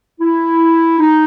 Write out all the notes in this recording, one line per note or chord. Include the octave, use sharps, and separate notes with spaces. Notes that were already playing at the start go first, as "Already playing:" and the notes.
E4
D#4